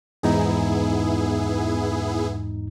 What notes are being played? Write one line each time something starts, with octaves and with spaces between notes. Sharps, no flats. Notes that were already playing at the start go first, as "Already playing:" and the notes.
E2 G#2 B3 D#4 E4 G#4